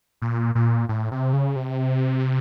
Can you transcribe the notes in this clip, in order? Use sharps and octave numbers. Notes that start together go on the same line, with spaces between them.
A#2
A#2
A2
C3
C#3
C3